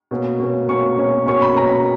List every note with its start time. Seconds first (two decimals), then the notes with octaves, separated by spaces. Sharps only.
0.11 B2 A#3 C#4
0.40 B2 A#3 C#4
0.68 B2 A#3 C#4 C#6
0.98 B2 A#3 C#4
1.26 B2 A#3 C#4 C#6
1.42 B5
1.56 B2 A#3 C#4 A#5